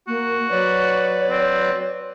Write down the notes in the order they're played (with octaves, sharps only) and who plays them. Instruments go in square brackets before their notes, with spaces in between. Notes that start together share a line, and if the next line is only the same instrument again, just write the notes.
[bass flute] A#3 [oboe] F#4
[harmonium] F#3 B4 D5 [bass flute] C#5
[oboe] C4